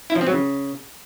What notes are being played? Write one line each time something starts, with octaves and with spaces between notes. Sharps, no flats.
E4
F3
C4
F#3
C#3